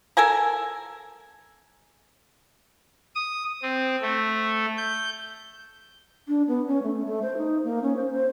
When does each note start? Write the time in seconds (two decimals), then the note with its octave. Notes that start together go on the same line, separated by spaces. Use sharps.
0.17 A4 A#4 G#5 A#5
3.15 D#6
3.62 C4
4.02 A3
4.77 G6
6.28 D4
6.48 B3
6.67 C#4
6.83 A3
7.05 A3
7.22 C5
7.37 D#4
7.64 A#3
7.83 C#4
7.96 C5
8.12 C5